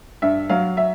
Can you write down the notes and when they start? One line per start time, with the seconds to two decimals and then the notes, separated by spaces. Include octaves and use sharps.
0.22 G2 E5
0.50 F#3 F5
0.77 E5